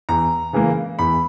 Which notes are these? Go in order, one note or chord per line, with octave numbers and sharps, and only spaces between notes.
E2 A#5
C#3 E3 A#3
E2 B5